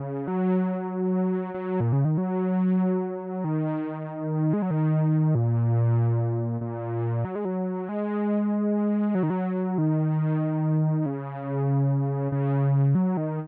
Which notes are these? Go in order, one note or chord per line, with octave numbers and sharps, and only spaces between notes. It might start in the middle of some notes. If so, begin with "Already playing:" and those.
Already playing: C#3
F#3
F#3
A#2
C#3
D#3
F#3
D#3
G#3
F#3
D#3
A#2
A#2
F#3
G#3
F#3
G#3
F#3
D#3
F#3
D#3
C#3
C#3
F#3
D#3